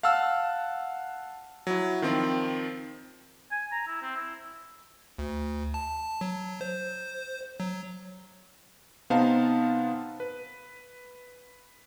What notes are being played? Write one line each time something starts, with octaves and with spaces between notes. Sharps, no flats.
F5 F#5 A5 E6 F6
F#3 E4
D#3 F3 C4
G#5
A#5
E4
C4
E4
D2
A5
F#3
C5
F#3
C3 B3 D#4 C5 F5 A5
B4